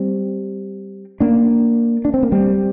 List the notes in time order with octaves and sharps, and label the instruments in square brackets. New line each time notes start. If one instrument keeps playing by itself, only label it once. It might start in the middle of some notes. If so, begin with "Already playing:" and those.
Already playing: [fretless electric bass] G3 C4
A#3 D4
D4
C4
A#3
G3 C4